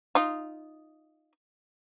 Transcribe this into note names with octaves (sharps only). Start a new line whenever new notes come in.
D#4 F4